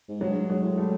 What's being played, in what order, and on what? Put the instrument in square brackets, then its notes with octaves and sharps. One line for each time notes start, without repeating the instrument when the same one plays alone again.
[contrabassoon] G#2
[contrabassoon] G2 [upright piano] F#3 G#3
[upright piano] F#3 G#3
[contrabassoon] A2
[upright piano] G3 A3